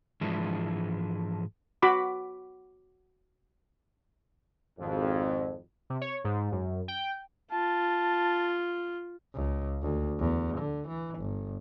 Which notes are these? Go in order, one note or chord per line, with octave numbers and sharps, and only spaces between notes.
G#2 E3 F3 G#3 D4 E4
F#4 B5 D6
G#1 F2
C3
C#5
G#2
F#2
G5
F4 A5
C#2
D2
E2
D3
E3
G1